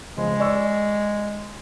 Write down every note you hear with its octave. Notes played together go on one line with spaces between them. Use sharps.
C#3 F3 G#3
D5 C#6 E6